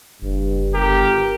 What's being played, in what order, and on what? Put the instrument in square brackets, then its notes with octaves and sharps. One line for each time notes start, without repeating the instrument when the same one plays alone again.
[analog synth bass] F#1 [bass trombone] G2
[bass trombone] G1 [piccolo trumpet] G4 [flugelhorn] A#4